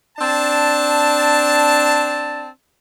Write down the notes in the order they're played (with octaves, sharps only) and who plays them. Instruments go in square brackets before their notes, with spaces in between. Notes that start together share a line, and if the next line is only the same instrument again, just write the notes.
[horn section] C4 D4 A5